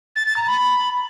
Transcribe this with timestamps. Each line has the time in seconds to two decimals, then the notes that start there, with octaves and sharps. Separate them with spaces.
0.16 A6
0.26 A6
0.37 A#5
0.47 B5